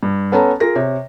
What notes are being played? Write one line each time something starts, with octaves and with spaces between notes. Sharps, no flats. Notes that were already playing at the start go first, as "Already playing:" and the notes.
G2
B3 C#4 A4 A5 A#5
F4 G#4 A#4 A#6
C3 C#5